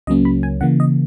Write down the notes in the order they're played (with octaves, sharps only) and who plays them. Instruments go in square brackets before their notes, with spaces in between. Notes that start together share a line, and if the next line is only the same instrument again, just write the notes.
[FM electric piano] C#2 C#3 F#3 A#3 C#4 D#5
B5
G#5
C#3 E3 A#3 F#5
D#5